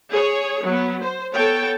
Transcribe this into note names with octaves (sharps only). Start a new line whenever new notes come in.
G#4 C#5
F#3 B3
C5
B3 A4 C#5 G5 A5